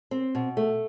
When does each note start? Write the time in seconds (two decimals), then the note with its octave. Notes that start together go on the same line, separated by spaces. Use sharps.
0.11 C4
0.35 B2
0.57 A3